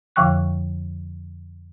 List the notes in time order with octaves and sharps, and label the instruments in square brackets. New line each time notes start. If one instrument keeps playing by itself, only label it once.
[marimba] F2 D3 F3 G5 C#6 F#6